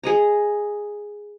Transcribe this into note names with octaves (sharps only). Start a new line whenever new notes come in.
G#4 D#5 A#5